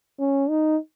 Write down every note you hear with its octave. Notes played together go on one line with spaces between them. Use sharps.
C#4
D#4